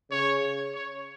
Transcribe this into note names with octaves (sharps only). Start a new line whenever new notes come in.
C#3 C#5
C#5